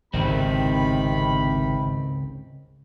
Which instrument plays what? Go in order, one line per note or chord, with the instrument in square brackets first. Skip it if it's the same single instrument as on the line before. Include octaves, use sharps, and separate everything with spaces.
[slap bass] G#1 [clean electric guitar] C#2 C4 [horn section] C3 D#3 B5